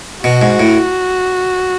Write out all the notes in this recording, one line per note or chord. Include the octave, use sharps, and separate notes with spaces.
B2 F#4
G#2
A2